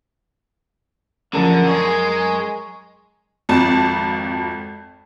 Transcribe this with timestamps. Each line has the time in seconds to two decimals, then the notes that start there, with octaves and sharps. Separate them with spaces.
1.33 F#2 D3 F3 C#4 A#4 A5
1.67 G#3 G#4 C#6
3.49 G#1 F2 A5